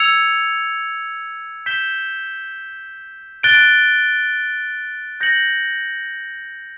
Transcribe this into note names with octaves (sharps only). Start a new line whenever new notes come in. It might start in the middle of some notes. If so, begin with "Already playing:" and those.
Already playing: E6 G#6 C#7 F7
G6 B6 E7 G7
F#6 A6 D7 G7
G6 A#6 C#7 F#7